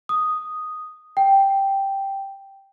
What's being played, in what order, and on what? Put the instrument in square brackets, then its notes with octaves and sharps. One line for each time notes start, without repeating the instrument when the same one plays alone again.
[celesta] D#6
G5